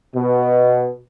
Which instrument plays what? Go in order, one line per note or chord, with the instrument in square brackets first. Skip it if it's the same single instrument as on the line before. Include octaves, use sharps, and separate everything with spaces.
[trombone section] B2